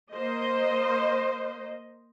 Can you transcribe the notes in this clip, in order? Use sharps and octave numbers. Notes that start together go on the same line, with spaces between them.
A#3 C5 D#5